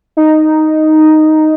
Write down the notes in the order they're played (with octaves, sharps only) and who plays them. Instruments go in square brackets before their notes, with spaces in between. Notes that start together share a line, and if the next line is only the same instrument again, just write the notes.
[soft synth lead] D#4